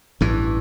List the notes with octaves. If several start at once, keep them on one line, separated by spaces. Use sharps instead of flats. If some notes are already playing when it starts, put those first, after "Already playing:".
A1 G2 E3